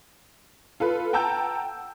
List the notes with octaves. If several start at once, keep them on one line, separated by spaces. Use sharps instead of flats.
F4 A4 B4
F#5 G5 A5 A#5 E6 G6